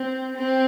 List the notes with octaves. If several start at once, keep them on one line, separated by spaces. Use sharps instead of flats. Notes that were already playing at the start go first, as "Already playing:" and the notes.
Already playing: C4
C4